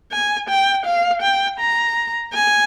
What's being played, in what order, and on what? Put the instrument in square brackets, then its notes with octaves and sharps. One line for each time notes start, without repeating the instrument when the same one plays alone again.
[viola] G#5
G5
F5
G5
A#5
G#5